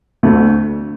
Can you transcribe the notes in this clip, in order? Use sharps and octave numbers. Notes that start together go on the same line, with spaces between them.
D2 D3 A3